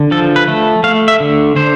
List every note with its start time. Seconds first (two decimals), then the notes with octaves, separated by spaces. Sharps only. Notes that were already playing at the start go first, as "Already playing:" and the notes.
Already playing: D3
0.11 F3 A4
0.36 B4
0.48 A3
0.84 A3 F5
1.08 E5
1.20 D3
1.56 D3 C5